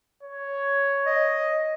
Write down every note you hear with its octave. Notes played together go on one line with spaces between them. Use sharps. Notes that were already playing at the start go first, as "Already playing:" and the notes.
C#5
D#5